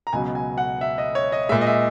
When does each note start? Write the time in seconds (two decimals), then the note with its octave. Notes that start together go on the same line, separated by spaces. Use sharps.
0.07 A#5
0.13 C#2 B2 F#3 G#5
0.35 G#5
0.58 F#5
0.81 E5
0.98 D#5
1.15 C#5
1.32 D#5
1.49 A#2 G#3 E5
1.61 D#5
1.67 E5